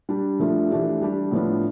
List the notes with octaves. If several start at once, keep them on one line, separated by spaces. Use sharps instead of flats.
G3 D4 G4
F3 A3 D4 F4
E3 A3 D4 G4
G3 D4 G4
A2 F3 B3 D4 F4